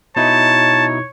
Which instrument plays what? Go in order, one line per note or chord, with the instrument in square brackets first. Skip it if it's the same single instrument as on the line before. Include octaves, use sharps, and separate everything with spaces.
[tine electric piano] B2 D#4 E4 [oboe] C#5 [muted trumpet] A5